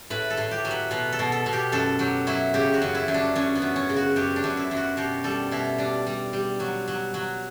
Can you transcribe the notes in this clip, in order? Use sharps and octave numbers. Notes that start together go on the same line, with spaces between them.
A2 B4
A4
A2
G4
F#3
B4
B2 B4
A4
B2
A4
B2
G4
F#2 A4
F#3 G4
F#3 E4
C#3 G4
F#4
F#2
E4
F#2
D4
F#2 C#4
B3
F#2
C#4
C#3
F#4
F#2 G4
D4
F#2
E4
F#2
F#4
B2 G4
G3 A4
B2 E4
G3 D4
G3
G3
F#3
F#3
F#3